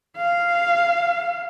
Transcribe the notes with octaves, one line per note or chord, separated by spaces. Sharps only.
F5